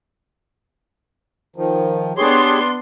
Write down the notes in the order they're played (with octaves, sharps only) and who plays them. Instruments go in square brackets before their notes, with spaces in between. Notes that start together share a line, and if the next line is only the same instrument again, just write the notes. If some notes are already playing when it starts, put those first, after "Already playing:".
[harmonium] D#3 F3
[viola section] B3 D4 C6 [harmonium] G4 G#4 C#5